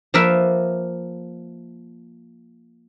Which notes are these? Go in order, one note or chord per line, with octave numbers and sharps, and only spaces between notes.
F3 A#3 A#4 B4 E5